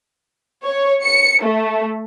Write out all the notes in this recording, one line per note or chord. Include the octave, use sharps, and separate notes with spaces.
C#5
C#7
A3